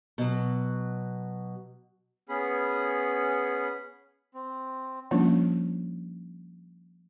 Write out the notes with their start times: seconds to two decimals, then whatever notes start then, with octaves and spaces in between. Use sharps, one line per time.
0.18 B2 F#3
2.29 B3 C#4 G#4 B5
4.35 C4
5.11 F3 G3 A#3 C#4 D4 F4